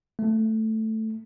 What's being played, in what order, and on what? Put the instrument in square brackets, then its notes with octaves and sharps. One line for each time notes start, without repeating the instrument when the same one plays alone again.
[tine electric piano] A3